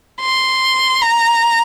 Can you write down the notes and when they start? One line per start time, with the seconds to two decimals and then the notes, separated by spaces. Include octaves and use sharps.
0.21 C6
1.01 A#5